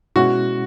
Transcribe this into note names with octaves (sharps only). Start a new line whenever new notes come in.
B2 G#3 C#4 E4 F#4